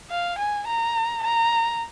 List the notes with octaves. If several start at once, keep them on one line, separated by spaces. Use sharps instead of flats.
F5
G#5
A#5
A#5